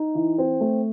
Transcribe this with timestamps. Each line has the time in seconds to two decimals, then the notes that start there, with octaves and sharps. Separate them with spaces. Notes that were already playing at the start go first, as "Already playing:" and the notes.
Already playing: D#4
0.15 E3
0.38 C4
0.61 A3